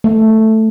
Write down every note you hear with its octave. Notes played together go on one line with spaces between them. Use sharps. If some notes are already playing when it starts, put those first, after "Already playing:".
A3